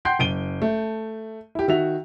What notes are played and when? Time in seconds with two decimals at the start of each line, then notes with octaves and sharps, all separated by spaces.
0.05 F#5 G5 C6 G6 C7
0.19 F#1 D7 D#7 G7
0.62 A3
1.55 E4 G4
1.68 D#3 F#4 E5 F7